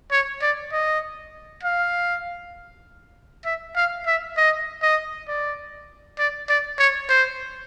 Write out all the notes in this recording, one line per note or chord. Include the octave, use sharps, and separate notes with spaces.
C#5
D5
D#5
F5
E5
F5
E5
D#5
D#5
D5
D5
D5
C#5
C5